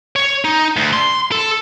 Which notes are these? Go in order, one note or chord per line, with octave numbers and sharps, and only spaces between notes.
C#5
D#4
D2
C6
A4